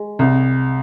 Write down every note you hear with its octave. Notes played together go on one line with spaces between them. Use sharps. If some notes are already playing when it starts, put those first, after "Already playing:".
Already playing: G#3
C2